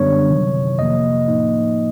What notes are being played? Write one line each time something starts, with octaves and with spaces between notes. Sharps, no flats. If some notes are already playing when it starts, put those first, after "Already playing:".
Already playing: F#2 D3 G3 B3 D4 C#5
C3 D#3 F#3
F2 C3 F3 A#3 D#5
A2 F3 A#3 D#4